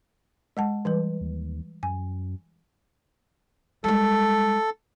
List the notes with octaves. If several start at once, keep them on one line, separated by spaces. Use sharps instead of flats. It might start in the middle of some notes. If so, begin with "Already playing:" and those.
G#3 F#5 A5
E3 G3 B4
D#2
F#2 G#5
G3 G#3 A4